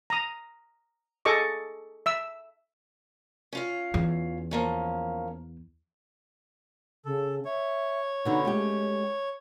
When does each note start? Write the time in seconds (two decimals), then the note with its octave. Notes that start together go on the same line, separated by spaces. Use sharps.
0.10 A#5 D#6
1.25 G#4 A4 D#5 C#6 D6
2.06 E5 E6
3.53 C#4 F4 F5
3.94 E2
4.51 F3 A#3 C#4
7.05 C#3 A4
7.45 C#5 E5
8.25 B2 D3 D#4
8.45 G#3 A3 C#4 G4